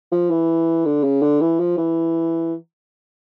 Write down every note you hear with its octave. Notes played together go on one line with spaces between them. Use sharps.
F3
E3
D3
C#3
D3
E3
F3
E3